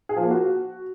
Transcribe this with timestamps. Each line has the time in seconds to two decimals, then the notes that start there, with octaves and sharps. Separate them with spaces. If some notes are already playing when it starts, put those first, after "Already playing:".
0.09 G#4
0.16 F3
0.23 A#3
0.30 F#4